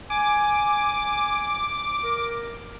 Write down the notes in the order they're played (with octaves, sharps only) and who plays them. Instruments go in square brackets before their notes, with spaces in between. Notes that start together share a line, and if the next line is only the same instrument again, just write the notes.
[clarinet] G#5 [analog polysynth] D6
[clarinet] A#4